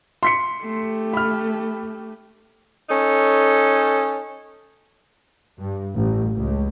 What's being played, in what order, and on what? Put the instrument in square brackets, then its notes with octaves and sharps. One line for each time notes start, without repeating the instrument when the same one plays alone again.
[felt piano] C6 B6 C#7
[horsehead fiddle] A3 G4
[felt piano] B5 F6
[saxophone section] C#4 D#4 A4
[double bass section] G2
A1
C#2